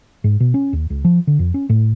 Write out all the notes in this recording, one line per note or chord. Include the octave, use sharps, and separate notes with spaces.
G#2
B2
C#4
D#2
C#2
F3
D3
F2
C#4
A2